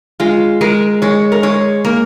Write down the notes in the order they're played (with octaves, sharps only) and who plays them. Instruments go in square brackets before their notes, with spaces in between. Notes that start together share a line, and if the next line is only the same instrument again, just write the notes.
[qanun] G#3 [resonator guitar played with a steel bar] F4
[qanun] G#3 [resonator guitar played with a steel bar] A#4
[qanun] G#3 [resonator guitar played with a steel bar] C#5
[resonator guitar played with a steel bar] A#4
[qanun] G#3 [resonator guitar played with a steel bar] C#5
[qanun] A#3 [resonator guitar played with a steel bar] A#4